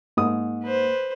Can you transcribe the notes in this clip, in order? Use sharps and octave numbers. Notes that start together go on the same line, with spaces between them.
G#2 A#3 D#6
B4 C5